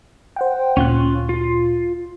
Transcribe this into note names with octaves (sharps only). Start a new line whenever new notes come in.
C5 F#5 G5
D2 A#2 C#4 F4 F#6
F4